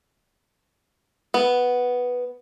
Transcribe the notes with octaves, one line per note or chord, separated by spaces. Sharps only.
B3